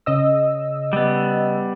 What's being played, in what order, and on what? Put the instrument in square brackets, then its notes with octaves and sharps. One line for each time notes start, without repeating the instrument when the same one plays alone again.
[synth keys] C#3 D#5 E6
[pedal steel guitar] G3 B3